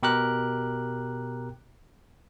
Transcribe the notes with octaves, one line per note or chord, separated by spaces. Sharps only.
B2 G4 A#4 F#6